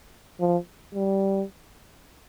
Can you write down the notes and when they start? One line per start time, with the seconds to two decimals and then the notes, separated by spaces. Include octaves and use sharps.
0.40 F3
0.94 G3